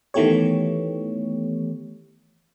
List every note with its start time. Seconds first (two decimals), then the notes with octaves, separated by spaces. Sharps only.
0.14 D#3 E3 A3 B3 G4 C#5